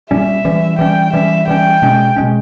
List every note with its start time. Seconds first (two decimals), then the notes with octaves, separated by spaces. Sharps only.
0.10 A#2 G3 C#4 E5
0.45 E3 G3 C#4
0.79 E3 G3 C#4 G5
1.13 E3 G3 C#4 E5
1.48 E3 G3 C#4 G5
1.82 B2 G#3 C#4
2.16 B2 G#3 C#4